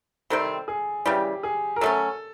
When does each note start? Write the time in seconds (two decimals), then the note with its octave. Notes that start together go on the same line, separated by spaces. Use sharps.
0.30 C3 D#3 G3 C4 A4
0.68 G#4
1.06 C#3 E3 G3 G4
1.43 G#4
1.76 A#4
1.81 F#3 A3 C#4 A4